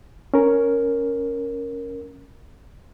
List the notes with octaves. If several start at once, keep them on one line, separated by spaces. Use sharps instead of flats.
C#4 A#4